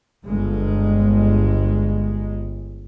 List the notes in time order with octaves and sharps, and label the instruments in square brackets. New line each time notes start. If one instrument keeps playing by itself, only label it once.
[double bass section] G1 G#3